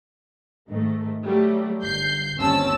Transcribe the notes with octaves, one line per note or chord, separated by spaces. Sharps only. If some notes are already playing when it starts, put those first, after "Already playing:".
G#2 D#3 A3
F#3 G3 A3
G1 G6 C7
G1 D#2 C4 C#4 A5 E6